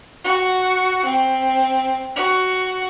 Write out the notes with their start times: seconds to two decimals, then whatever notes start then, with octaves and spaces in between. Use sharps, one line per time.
0.24 F#4
1.05 C4
2.16 F#4